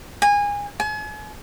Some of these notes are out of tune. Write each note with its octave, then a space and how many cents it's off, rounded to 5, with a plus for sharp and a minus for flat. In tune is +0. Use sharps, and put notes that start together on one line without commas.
G#5 -25
G#5 +40